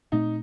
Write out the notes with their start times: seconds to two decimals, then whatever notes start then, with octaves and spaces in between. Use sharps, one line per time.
0.12 A#2 A3 C4 D#4